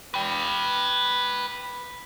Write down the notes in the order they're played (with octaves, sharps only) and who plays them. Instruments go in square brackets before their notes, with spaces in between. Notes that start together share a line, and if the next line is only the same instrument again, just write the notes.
[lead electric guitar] B4 G5